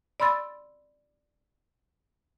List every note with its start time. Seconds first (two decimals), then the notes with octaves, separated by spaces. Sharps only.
0.20 D5 B5 C6 E6 A6